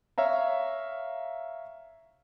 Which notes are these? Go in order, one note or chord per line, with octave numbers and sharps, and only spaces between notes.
C#5 E5 F5 A#5